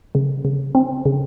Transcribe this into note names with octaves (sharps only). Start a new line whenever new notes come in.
C#3
C#3
C4
C#3